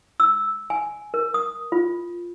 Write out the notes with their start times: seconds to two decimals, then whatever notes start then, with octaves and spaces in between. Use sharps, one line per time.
0.20 E6
0.70 G#5
1.14 A#4
1.34 D#6
1.72 F4